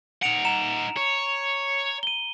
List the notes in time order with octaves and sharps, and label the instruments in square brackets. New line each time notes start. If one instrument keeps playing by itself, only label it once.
[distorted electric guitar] D#4 F#5 [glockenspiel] D7 F7
[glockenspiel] A#5 C#7 E7
[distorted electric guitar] C#5
[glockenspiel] D#7 G7